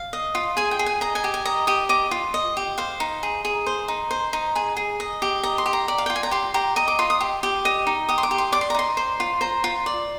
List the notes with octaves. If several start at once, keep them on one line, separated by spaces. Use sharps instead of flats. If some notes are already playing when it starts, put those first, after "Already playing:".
Already playing: F5
D#5
F4
G#4 G#5
G5
G#4
G#5
D#5 A#5
G#5
G4
G#5
D#5 A#5
G4 D#6
D#5 D6
F4
D#5
G4
C5 F5
D#4
G#4
G#4
C5
D#4
C5
D#4
G#4 G#5
G#4
D#5
G4
D#5 A#5
C6
G4
A#5
D5
F5
G5
F4
G#5
A#5
G4 C6
G4 A#5
D#5 A#5
D6
F4 C6
D#6
G4
G4
D#5
D#4
G4 D#6
C6
D6
G4
C6
D5 D6
C6
A#5
D#4 C6
C5
F4
C5 A#5
F4
D5